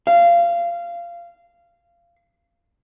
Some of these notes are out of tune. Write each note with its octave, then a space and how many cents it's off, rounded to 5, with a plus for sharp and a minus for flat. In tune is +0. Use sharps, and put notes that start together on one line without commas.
F5 -20